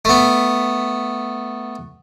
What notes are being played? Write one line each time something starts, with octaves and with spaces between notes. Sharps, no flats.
A3 B3